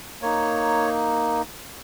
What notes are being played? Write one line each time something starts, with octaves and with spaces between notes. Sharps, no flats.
A#3 D#4 C#5